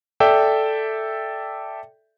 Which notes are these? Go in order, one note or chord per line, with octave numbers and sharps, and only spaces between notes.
A4 D5 E5 G5